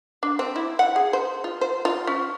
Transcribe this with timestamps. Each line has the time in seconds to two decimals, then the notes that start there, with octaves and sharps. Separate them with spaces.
0.23 D4
0.39 C4
0.56 E4
0.79 F#5
0.96 G#4
1.13 C5
1.44 F4
1.61 C5
1.85 F4
2.07 C#4